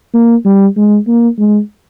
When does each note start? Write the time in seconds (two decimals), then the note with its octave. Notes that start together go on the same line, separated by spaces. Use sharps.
0.14 A#3
0.45 G3
0.76 G#3
1.07 A#3
1.38 G#3